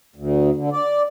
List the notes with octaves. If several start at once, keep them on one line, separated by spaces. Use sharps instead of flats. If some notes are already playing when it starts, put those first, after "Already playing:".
D2
D3
D5